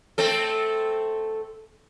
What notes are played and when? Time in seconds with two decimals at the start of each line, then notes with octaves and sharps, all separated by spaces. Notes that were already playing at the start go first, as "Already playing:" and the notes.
0.18 A3 C4 A4